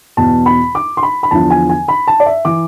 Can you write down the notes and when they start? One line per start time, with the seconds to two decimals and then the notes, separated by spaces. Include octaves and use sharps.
0.17 E2 B2 A5
0.46 B5
0.75 D6
0.97 C6
1.03 B5
1.23 B5
1.31 E2 D3 F3 A5
1.50 G#5
1.69 G#5
1.88 B5
2.07 A5
2.20 D5
2.26 E5
2.45 E3 D6